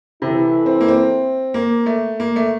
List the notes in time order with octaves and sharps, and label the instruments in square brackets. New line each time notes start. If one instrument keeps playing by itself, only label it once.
[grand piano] C3 [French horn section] E3 A3 E4
[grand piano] C4
A#3
C4
A#3
A3
A#3
A3